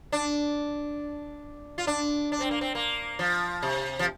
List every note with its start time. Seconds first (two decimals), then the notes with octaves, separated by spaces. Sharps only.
0.12 D4
1.78 F4
1.87 D4
2.32 D4
2.41 C4
2.51 A#3
2.61 C4
2.75 A#3
3.19 F3
3.62 C3
3.99 F3